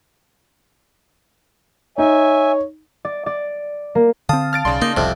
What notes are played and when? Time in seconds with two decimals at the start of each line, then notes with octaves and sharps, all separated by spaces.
1.98 D#4 C#5 E5 G#5
3.05 D5
3.26 D5
3.95 A#3
4.29 D3 C4 F5 A5 D#6
4.53 F6 A6 D7
4.65 B1 C#3 D5 C6
4.82 A#3 D#4
4.97 F1 C2 F2 C3